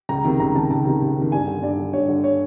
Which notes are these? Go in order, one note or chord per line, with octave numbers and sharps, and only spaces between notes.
C#2 A#5
C3 D#3
C#2 A#5
C3 D#3 A5
C#2 A5
C3 D#3
C#2
C3
D#3
G2 G#5
D3
G2 D5
D3
G2 C#5
D3
C#5